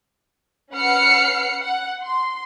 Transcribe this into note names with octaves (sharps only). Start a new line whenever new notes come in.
C#4 B4 F#5 F6 C7 C#7
F#5
C6